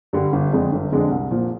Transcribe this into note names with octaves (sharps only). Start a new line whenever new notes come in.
G2 D3 G3
G1
F2 D3 G#3 D4
G1
F2 D3 G#3 D4
C2
A#2 F3